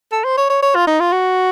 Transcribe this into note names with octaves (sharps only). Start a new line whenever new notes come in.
A4
C5
C#5
C#5
C#5
F4
D#4
F4
F#4